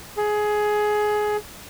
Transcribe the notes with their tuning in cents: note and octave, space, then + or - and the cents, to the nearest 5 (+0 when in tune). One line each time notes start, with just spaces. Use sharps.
G#4 +15